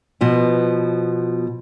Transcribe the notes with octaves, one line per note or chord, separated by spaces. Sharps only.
B2 F3 B3